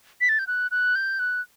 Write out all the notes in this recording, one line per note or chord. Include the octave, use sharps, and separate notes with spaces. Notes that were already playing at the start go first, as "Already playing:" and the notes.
B6
A6
G6
F#6
F#6
G6
F#6